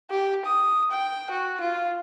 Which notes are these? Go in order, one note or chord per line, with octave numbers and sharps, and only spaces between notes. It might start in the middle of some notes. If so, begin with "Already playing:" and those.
G4
D#6
G5
F#4
F4